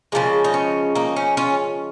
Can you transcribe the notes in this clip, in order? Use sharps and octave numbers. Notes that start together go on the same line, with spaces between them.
C#3 F3 G#3 A#3
D#4
C#4
A#3 D#4
C#4
C#4 F4